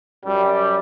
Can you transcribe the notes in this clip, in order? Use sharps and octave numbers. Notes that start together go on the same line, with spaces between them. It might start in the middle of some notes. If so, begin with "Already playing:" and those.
F#2 G3